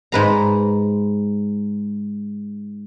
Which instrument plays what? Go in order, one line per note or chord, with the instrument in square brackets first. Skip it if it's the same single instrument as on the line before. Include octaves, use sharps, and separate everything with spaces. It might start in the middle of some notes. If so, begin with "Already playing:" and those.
[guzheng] G#2 B4 A#5